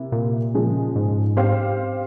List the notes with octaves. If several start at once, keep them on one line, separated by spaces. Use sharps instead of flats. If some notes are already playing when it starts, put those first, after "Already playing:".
Already playing: C3 A#3 E4
A#2
C#3 F3 G#3
G#2
C4 G4 C5 F5